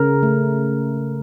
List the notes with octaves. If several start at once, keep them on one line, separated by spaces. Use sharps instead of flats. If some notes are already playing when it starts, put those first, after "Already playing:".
Already playing: C#3 A#4
A3